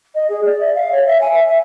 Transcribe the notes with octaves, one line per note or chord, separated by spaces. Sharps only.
D#5
G#4
D5
E5
F5
C#5
E5
G#5
E5
E5